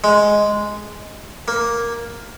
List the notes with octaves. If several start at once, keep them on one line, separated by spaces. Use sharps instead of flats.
G#3
A#3